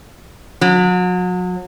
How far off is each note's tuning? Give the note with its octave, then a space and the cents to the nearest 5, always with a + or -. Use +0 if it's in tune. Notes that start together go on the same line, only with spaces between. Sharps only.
F#3 -35